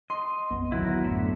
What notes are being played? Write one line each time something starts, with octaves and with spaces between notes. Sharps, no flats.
D#5 C6
A#1 F2 B3 C#4
D1 D3 D#3 F#3 B3 E4 F#4 A#4
A1 F#2 D3 A3 E5